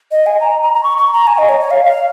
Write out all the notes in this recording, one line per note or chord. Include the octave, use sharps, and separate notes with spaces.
D#5
G#5
A#5
A#5
A#5
C#6
C#6
A#5
G#5
D#5
C#5
C#5
F5
F5